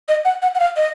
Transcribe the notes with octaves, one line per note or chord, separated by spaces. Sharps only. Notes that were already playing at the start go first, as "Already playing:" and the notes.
D#5
F#5
F#5
F#5
F5
D#5